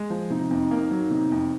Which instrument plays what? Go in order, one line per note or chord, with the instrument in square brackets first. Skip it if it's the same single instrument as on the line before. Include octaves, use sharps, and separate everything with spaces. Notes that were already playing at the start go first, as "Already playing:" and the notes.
Already playing: [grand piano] G#3
F3
[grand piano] C3 [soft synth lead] D#4
[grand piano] F2
A#3
F#3
C3
F2